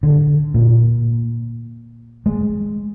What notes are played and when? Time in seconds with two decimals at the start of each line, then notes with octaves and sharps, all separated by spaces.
0.03 D3
0.54 A#2
2.26 G#3